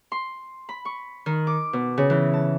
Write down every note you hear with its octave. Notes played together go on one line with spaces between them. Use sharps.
C6
B5
C#6
D#3
D6
B2
C#3
E3
A5